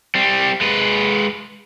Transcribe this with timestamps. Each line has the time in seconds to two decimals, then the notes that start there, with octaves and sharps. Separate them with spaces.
0.15 G3 C4
0.61 G#3 B4